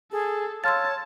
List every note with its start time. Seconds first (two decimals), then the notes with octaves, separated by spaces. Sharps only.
0.12 G#4 A4
0.64 C#5 F5 A5 C6 E6 F6 A6